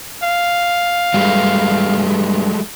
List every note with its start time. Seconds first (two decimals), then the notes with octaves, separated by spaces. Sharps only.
0.23 F5
1.14 G2 F#3 G#3 A3